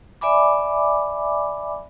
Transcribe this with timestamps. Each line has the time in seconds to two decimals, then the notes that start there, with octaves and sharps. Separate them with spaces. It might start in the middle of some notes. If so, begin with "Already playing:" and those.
0.21 D5 E5 G#5 B5 D6